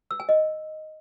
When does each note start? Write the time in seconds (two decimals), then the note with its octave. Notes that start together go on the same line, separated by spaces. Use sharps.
0.11 E6
0.20 G#5
0.29 D#5